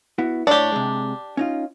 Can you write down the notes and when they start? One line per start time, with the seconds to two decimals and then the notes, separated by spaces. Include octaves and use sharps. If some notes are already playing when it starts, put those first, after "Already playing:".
0.18 B3 E4 F#4
0.47 A2 D4 G4 C#5
0.72 C3 G#3
1.37 C#4 D#4 F4